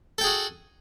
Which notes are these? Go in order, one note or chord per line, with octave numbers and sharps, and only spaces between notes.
F#4 G#4 A4 G5